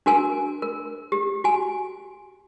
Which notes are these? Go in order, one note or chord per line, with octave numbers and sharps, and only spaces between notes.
D4 F#4 A#4 G#5
A#4
G4
F#4 G#5